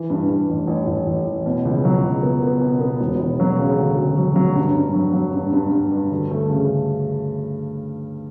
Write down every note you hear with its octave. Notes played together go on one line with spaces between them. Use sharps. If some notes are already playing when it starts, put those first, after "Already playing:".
Already playing: E3
G2
G2
A1
A1
A1
A1
A1
B2
C#2
F#3
C#2
B3
B3
B2
B3
E1
E1
F#3
C#3
D2
C#3
F#3
F#3
G2
G2
F#3
F#3
G2
G2
G2
G2
D2
A3
C#3